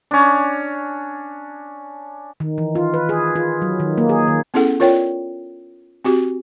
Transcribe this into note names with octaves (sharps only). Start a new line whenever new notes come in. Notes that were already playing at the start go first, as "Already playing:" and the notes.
C#4 D4
D#3
E3
F4
B4
G#4
F4
F#3
D#3
A#3
G#4
D#3
B3 C#4 E4 G#4 A4 F#5
F4 A#4 C#5 D5 G5
C4 F#4 G4